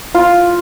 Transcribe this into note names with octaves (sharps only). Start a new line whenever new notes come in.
F4